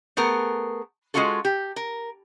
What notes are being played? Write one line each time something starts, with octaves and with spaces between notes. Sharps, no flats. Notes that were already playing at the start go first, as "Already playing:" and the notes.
A3 B3 G#4 A#4
G#3 C4 C#4 F4 F#4 A4
G4
A#4